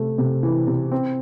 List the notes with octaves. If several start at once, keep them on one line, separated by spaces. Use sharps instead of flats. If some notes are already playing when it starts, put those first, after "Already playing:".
Already playing: C3 A3
C3
E3
C3
C4